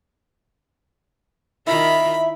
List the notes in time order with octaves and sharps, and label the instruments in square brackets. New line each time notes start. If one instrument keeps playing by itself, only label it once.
[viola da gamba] D#3 F4 A#4 [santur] E4 [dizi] E5 [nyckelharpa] B5